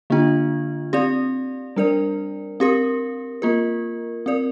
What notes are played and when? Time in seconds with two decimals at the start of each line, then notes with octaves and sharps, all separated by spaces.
0.10 D3 A#3 D4 F4
0.93 C4 G4 D5
1.77 G3 D4 A#4 D5
2.60 C4 G4 A#4
3.42 A#3 F4 A#4
4.26 C4 A#4 D5